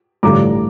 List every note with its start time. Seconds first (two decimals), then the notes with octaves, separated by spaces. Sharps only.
0.23 A1 G2 D3 A#5 D6